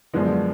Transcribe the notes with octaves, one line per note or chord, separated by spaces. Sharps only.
F#2 D3 F3 G#3 B3